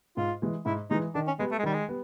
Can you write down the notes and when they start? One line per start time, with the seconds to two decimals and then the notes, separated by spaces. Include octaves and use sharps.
0.17 G#2 F4
0.42 E3 G#3
0.66 G#2 E4
0.90 E3 G#3 D#4
1.15 D#3 D4
1.27 C#4
1.39 G3 G#3 B3
1.51 A3
1.59 G#3
1.63 D#3 G3
1.73 G#3
1.88 G3 B3